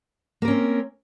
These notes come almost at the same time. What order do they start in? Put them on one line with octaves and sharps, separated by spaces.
A#3 A#4 C#4 C4